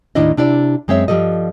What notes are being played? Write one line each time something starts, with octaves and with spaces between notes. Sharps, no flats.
D#2 A2 D#3 D4 E4 D#5
C3 D4 E4 D5
F#2 G#3 C4 C#5 E5
G2 F3 G3 A4 D#5